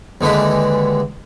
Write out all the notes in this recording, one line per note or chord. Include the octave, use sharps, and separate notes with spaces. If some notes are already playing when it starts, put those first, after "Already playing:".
D#2 D3 E3 G#3 B5